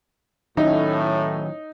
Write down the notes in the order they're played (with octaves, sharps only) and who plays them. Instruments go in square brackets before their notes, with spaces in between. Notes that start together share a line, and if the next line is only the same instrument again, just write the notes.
[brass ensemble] A2 [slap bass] D#3 F#3 [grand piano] C#4 E5 [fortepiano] D#4